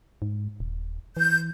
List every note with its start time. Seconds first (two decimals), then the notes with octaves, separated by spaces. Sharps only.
0.22 G#2
0.60 D#1
1.17 E3 G6